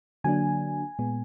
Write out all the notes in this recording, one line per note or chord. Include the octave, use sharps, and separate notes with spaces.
D3 F#3 A#3 D4 G#5
A#2 G#3 B3